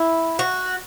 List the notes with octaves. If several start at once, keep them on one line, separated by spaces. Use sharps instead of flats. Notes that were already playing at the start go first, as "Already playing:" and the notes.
Already playing: E4
F#4